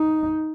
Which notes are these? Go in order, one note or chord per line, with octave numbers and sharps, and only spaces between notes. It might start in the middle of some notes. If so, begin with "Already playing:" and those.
Already playing: D#4